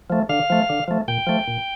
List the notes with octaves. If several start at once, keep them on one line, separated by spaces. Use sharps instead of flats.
F3 A3
D3 F5
F3 A3
D3
F3 A3
A#2 G5
F3 A3
A#2